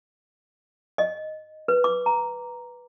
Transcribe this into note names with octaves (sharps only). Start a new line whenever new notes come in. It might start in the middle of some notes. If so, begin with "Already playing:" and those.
D#5
B4
D6
A#5